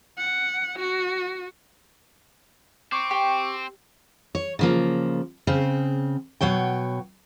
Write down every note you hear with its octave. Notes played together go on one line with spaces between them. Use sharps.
F#5
F#4
C4 C#6 D6
G4
C#5
C#3 F3 A#3
C#3 C4
B2 F#3 C#5 G5